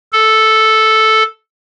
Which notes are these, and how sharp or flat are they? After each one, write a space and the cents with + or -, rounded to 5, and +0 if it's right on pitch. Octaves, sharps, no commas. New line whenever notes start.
A4 -5